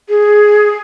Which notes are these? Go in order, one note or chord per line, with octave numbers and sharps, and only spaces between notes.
G#4